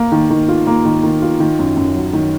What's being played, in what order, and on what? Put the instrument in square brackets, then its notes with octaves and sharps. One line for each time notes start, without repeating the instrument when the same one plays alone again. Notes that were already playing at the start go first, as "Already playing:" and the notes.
Already playing: [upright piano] A#3
D#3
D#3
F4
A#3
D#3
D#3
F4
D#3
F#2
F#2
F#3
D#3